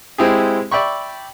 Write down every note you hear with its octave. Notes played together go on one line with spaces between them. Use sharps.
G#3 C4 E4 G4 G#4
D5 E5 G5 B5 C#6